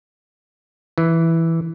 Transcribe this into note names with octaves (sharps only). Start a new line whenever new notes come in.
E3